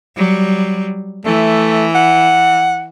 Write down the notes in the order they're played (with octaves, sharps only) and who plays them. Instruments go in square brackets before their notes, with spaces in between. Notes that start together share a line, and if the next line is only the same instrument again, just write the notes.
[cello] F#3 G3
[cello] E3 [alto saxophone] A3
[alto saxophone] F#5